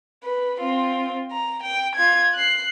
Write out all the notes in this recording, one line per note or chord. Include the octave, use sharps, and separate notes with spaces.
B4
C4 F4
A#5
G5
F4 G#6
F#6 C7